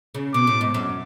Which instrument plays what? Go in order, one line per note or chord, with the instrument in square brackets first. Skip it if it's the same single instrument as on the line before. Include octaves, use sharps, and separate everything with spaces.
[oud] C#3
[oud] B2 [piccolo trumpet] D6
[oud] A2
G#2
F#2